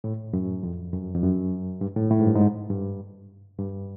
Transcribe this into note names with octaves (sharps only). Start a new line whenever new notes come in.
A2
F#2
F2
F#2
F2
F#2
G2
A2
A2
G#2
G2
G#2
G2
G2